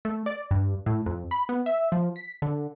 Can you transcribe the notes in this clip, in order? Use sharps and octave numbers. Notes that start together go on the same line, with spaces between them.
A3
D5
G2
A2
F2
B5
B3
E5
F3
B6
D3